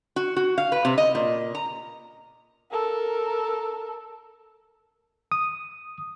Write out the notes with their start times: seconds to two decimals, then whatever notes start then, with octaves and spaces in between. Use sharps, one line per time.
0.16 F#4
0.36 F#4
0.58 F5
0.72 B4
0.85 C3
0.98 D#5
1.15 A#2
1.55 A#5
2.71 A4 A#4
5.32 D#6